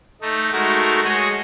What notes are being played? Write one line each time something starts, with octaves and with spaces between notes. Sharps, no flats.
A3 D#4
G#3 A3 D#4 F#4 A#4
G#3 F#4 G#4 C#5 D#5 F#5